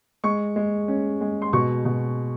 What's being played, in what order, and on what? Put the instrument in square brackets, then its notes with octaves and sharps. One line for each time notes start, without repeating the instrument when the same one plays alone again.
[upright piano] G#3 C#6
G#3
C#4
G#3
C6
B2 C#6
B2